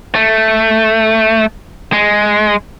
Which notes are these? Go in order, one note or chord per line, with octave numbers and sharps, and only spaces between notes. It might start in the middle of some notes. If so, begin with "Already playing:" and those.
A3
G#3